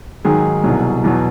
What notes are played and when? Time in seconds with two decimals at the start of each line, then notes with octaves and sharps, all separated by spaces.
0.25 G#2 D#3 F#3 G#4
0.64 C2 B2 F#3
1.04 E2 B2 F#3